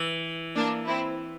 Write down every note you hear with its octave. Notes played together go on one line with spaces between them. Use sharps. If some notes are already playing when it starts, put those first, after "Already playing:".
Already playing: E3
A#3 D4
C4 E4